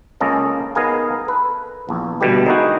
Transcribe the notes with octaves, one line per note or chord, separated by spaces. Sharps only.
C#2 A#3 C#4 A4 D#5
B3 D#4 G#4 A#4 F5 G#5
A4 B4
A#1 E2
B2 D3 G3 A3 B3 G4
G#3 A#3 D#4 E4 F#4 G5